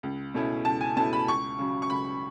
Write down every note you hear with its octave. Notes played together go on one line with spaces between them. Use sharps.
C#2
B2 A3 C#4 E4
C#2 A5
G#5
B2 A3 C#4 E4 A5
B5
C#2 C#6
C#3 F#3
C#6
C#2 B5